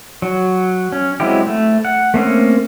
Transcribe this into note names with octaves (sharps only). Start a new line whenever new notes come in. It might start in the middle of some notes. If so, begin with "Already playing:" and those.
F#3
C#4
F#3 G#3 C4 E4 G4
A3
F#5
A3 A#3 C4 C#4